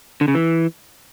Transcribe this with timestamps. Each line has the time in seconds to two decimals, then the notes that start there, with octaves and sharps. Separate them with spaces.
0.21 D3
0.28 C#3
0.35 E3